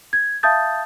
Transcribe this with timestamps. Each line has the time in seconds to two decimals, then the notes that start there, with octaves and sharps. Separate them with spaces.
0.13 G#6
0.43 E5 F5 A5 D#6 G6 A6